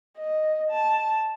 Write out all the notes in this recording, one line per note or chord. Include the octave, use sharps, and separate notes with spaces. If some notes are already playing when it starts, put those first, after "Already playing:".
D#5
A5